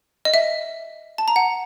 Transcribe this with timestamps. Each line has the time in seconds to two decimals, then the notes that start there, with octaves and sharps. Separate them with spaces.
0.25 D#5
0.34 E5
1.18 A5
1.28 A#5
1.36 F#5